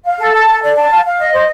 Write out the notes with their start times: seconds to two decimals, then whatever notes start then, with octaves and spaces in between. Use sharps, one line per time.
0.04 F5
0.19 A4
0.32 A5
0.47 A4
0.62 D5
0.75 A5
0.89 F5
1.04 F5
1.18 D#5
1.33 C5